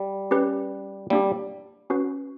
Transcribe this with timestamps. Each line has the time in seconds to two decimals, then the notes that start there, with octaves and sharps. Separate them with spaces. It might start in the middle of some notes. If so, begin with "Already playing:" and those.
Already playing: G3
0.31 C#4 G4 B4
1.10 G3 A#3 D4 G4
1.90 C#4 F#4 B4